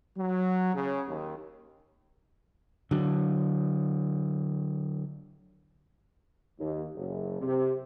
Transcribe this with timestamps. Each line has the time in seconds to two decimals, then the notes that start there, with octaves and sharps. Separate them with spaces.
0.17 F#3
0.74 C#3
1.07 D#2
2.91 D3 F#3
6.59 D#2
6.96 F#1
7.41 C3